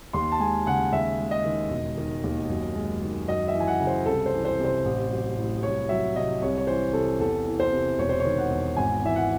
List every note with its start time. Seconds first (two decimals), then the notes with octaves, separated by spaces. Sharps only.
0.13 D#2 C6
0.32 A5
0.40 G#3 G#5
0.66 C#3 F#5
0.93 D#2 E5
1.19 G#3
1.31 D#5
1.45 D#3
1.70 E1
1.97 D#3
2.24 D#2
2.50 F#2
2.75 G#3
3.02 D#3
3.27 F#2 D#5
3.48 E5
3.53 E3
3.60 G#5
3.68 F#5
3.80 C#3
3.87 C5
4.06 C2 A4
4.26 C5
4.33 E3
4.45 C5
4.59 C3
4.64 C5
4.85 A1
5.11 F#3
5.37 A2
5.63 C2 C#5
5.89 F#3 E5
6.16 C3 D#5
6.42 C2 C#5
6.57 C#5
6.67 E3 C5
6.93 C3 A4
7.19 E2 A4
7.47 E3
7.60 C5
7.72 C3
7.99 E1 C#5
8.09 C5
8.20 C#5
8.25 D#3
8.38 F#5
8.50 E2
8.76 G#1 G#5
9.02 E3 E5
9.16 F#5